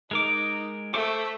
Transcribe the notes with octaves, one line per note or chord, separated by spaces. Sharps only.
G#3 D#4 A#4 D6
A3 C5 E5 C#6 D6